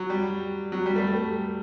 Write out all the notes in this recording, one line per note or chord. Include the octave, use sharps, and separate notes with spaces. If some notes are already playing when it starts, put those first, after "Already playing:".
Already playing: F#3
G3
F#3
G3
A3
G3
A3